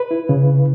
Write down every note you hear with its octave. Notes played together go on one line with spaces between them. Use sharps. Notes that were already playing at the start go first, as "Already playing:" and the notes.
Already playing: B4
E4
C#3